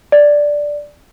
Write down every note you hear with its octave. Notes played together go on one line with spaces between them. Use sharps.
D5